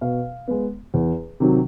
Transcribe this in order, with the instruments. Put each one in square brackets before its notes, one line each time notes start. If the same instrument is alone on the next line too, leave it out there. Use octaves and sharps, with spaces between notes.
[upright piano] B2 F5
G#3 B3
E2
C3 D#3 F#3